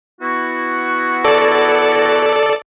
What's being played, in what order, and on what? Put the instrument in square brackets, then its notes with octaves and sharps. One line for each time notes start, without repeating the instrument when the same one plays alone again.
[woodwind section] B3 E4 F#4
[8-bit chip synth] A4 D5